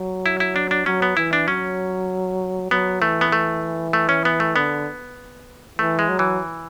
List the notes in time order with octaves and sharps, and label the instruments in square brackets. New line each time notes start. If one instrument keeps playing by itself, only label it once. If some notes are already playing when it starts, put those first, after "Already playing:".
Already playing: [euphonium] F#3
[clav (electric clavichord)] E4
E4
D4
D4
[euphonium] F#3 [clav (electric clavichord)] C#4
[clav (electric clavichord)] B3
[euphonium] E3 [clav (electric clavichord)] E4
[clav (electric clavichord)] D4
[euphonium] F#3 [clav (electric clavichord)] C#4
[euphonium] F#3 [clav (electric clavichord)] B3
[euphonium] E3 [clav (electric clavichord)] A3
[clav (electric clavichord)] B3
A3
A3
C#4
B3
A3
[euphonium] D3 [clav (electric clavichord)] B3
[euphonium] E3 [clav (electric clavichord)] A3
[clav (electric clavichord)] G#3
[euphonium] F#3
[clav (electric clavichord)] E3